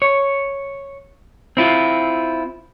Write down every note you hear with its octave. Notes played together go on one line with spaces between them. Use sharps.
C#5
C4 E4 F4